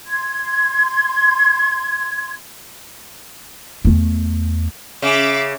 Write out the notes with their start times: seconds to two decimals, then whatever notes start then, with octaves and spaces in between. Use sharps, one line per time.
0.07 C6 G#6
3.85 E2 A3
5.02 C#3 E5 D6